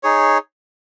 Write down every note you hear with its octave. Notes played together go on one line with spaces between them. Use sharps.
D#4 G#4 C#5